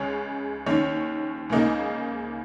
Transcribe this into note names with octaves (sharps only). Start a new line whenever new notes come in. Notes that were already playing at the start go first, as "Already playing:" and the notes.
Already playing: C#2 C#3 G#3 C#4 C#5
D#2 D#3 C#4 C#5
C#2 C#3 A#3 D#4